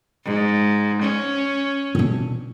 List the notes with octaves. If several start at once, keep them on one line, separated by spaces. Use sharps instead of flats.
G#2
C#4
B2 D4